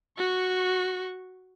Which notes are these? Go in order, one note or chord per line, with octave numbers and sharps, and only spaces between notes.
F#4 C#6